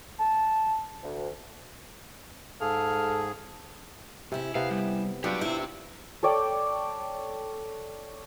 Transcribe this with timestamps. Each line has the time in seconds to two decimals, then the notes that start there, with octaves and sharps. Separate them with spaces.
0.19 A5
1.03 D2
2.61 G#2 G#4 A4 F5
4.32 C3 C#4 E4
4.55 C3 B3 F5
4.71 G3
5.24 F#3 D4 F4 G4 B4 D5
5.41 E4 G4 C5
6.23 A4 C#5 D5 G5